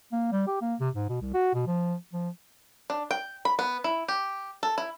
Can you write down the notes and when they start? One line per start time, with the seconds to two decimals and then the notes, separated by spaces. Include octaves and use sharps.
0.12 A#3
0.32 G3
0.47 G4
0.61 A#3
0.80 C3
0.95 G#2
1.09 B2
1.21 C2
1.34 F#4
1.54 B2
1.67 F3
2.13 F3
2.90 D4
3.11 G5
3.45 B5
3.59 B3
3.84 E4
4.08 G4
4.63 A4
4.78 E4